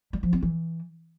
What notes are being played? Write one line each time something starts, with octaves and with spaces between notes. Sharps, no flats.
G3
F3
C4
E3